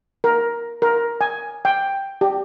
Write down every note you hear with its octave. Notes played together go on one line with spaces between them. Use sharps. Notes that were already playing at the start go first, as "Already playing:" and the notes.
A#4
A#4
G#5
G5
G4